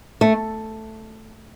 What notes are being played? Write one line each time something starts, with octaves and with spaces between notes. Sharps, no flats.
A3